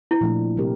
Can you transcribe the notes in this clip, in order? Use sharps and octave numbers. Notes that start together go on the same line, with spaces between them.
E4
A#2 F3 A3 D4
C3 G3 C4 G4 A#4